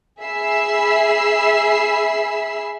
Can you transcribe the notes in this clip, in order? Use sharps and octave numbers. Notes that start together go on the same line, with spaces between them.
G#4 E5 B5 E6 C7